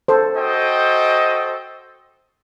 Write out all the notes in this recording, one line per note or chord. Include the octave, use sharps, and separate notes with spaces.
A4 C5
F#4 A4 C5 D#5 G5